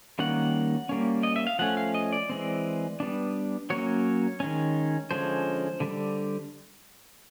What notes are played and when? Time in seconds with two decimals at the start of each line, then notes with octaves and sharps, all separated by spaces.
0.19 D#3 G3 A#3 C#4 F#5
0.89 G3 A#3 C#4
1.23 D#5
1.36 E5
1.47 F5
1.59 F3 A3 C#4 F#5
1.77 F5
1.94 D#5
2.13 D5
2.29 E3 G#3 C4
3.00 G3 B3 D4
3.70 F#3 A#3 C#4 C#5
4.40 D#3 G#3 C#4
5.11 D3 F3 G#3 C#4 C5
5.80 D3 G3